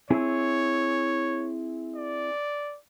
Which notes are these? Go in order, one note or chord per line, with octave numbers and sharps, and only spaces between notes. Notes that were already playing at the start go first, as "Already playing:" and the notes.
C4 E4 G#4 C#5
D5